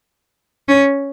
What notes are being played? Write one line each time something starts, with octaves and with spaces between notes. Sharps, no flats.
C#4